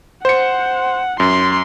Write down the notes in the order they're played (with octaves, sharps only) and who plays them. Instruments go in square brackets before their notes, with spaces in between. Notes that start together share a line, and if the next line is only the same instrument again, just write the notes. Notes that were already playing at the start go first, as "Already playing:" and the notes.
[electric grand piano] C5 C#7 [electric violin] F#5
[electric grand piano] F#2 [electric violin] C6